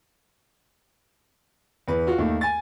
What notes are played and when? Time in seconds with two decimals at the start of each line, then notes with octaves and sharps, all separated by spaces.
1.88 E2 B4
2.07 F4 F#4
2.18 D#2 D#3 A3
2.41 G#5 A6